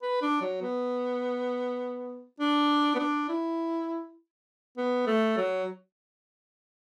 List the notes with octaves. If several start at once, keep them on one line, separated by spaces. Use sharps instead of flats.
B4
D4
F#3
B3
D4
B3
D4
E4
B3
A3
F#3